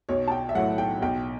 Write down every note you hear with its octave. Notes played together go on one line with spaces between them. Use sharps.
B1 C#5
A5
G5
E5
A2 F#3 F#5
G5
B1 G5